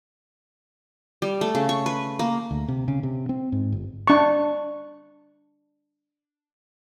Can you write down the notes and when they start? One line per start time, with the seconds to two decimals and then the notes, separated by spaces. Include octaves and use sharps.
1.22 G3
1.41 A3
1.55 C#3
1.69 C#6
1.86 B4
2.19 A#3
2.51 D2
2.68 C3
2.88 C#3
3.03 C3
3.29 C4
3.52 G#2
3.72 G1
4.08 D4 C#6